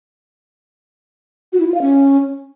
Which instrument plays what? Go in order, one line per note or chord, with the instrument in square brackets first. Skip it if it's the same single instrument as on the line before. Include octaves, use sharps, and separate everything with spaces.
[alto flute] F#4
E4
F4
F5
C#4